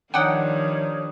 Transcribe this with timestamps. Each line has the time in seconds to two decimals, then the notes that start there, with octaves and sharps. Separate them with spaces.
0.14 D#3 F3 G3 D4 D#4 C#5 F#5 G5